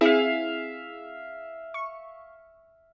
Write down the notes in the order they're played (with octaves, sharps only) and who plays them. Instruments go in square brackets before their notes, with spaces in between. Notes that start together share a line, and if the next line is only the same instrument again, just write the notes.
[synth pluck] C4 E4 G#4 [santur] E5 F5
[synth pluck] C#6